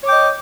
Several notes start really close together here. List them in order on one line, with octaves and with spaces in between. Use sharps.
C#5 D6 G5 D#5